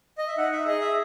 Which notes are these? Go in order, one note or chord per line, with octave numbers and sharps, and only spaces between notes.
D#5
E5
D#4 F#5
E5
G#4 D#5
E5